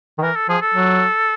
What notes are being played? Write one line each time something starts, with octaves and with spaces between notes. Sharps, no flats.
D#3
E3 A#4
A4
F3 G#4
A4
F#3